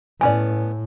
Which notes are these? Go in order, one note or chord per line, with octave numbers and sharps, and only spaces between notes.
A2 B3 C#4 D5 G#5